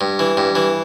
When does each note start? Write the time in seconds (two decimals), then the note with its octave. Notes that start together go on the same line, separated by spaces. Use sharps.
0.01 G2
0.19 E3
0.37 G2
0.55 E3